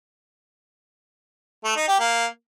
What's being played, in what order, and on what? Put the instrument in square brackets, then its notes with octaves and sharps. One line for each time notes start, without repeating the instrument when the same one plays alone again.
[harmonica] A3
D#4
G4
A#3